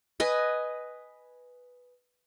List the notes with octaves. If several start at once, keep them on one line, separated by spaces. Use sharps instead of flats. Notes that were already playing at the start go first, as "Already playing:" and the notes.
B4 D#5 G#5